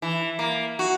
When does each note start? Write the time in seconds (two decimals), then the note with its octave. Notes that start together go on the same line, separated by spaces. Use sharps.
0.02 E3
0.39 A#3
0.79 F#4